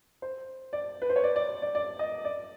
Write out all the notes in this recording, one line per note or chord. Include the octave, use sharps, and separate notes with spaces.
C5
D5
B4
C5
C#5
D5
D5
D5
D5
D#5
D5